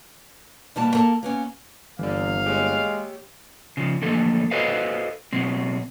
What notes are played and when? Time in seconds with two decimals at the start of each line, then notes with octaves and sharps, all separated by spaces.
0.76 B2 E3 G3 A#3 G4 A5
0.95 A#3 A4 A#4 A5
1.23 A#3 B3 C#4
1.99 G1 E3 D5 F5
2.46 G#3 G4 C#5
3.77 C#3 F3
4.02 D3 E3 F3 A3 A#3 A4
4.51 F#4 A4 B4 C5 D#5 F5
5.33 B2 F#3 C4